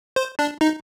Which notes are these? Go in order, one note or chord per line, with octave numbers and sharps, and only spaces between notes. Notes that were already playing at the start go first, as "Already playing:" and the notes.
C5
D4
D#4